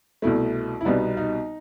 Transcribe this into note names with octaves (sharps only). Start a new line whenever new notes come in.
C2 B2 A3 E4
E4
C2 B2 G3 B3 D#4
D#4